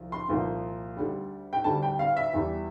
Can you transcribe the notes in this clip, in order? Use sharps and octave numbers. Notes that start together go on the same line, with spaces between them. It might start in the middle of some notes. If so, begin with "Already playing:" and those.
Already playing: C2 F3
C6
C2 A#2 F3
D2 D3 G3
G5
D2 D3 G3 A5
G5
F5
E5
E2 E3 G3